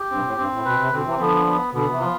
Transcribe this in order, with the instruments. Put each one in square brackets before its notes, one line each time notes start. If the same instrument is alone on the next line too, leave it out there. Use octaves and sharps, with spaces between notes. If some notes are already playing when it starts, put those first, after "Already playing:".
Already playing: [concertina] G4
[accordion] G2 [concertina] C4
[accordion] B2
A2
[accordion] G2 [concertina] C4
[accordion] A2
[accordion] B2 [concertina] B4
[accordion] C3
[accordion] B2 D3 [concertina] C4
[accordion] C3 E3
[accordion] D3 F3 [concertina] B3
[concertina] B3
[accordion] B2 D3 [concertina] B3
[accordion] C3 E3
[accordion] F3 [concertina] F4